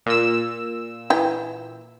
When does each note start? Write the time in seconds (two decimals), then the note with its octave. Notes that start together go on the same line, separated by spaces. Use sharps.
0.06 A#2 E6
1.10 E3 G5